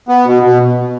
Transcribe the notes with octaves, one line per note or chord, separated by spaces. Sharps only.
B3
B2
B2